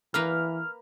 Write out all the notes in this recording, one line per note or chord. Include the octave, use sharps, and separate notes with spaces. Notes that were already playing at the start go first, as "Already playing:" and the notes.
E3 A#3 A#4 B4 F6